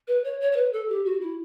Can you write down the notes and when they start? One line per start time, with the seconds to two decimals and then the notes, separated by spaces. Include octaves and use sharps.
0.08 B4
0.24 C#5
0.41 C#5
0.52 C#5
0.56 B4
0.73 A4
0.89 G4
1.05 F#4
1.21 E4